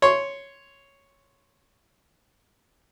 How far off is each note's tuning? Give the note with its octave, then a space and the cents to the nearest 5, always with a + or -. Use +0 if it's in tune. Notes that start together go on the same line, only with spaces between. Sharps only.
C#5 +0 C6 +0